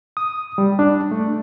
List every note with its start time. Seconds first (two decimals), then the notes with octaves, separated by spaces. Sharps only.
0.17 D#6
0.58 G3
0.79 D4
1.11 A3